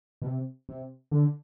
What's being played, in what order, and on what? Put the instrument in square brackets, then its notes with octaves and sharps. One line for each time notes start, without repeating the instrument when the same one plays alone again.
[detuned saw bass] B2
C3
C3
D3